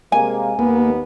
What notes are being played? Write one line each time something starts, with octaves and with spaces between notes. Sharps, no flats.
C3 G#3 A#3 G#5
D#2 A#3 B3